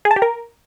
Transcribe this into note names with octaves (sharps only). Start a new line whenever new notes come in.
G#4
A5
G4
A#4